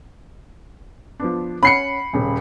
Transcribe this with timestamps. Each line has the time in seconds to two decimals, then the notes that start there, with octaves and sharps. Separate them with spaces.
1.20 F3 B3 D4
1.63 C#4 F#5 B5 C7 C#7
2.13 D#1 C#3